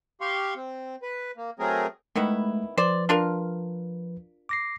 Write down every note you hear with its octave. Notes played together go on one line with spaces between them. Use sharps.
G4 F5 C6 C#6
C4
B4
A#3
F#3 A3 C4 G#4 A#4
D#3 G#3 A3 B3 E4
F3 B4 C5 D5
D4 F4 A#4
D6 A#6 C7